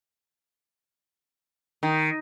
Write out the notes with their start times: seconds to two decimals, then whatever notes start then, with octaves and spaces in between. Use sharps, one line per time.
1.83 D#3